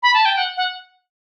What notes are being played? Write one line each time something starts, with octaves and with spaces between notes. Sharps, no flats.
B5
A5
G5
F#5
F#5